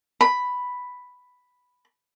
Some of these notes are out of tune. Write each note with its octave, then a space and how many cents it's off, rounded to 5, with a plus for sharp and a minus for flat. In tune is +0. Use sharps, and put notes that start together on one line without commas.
B5 +5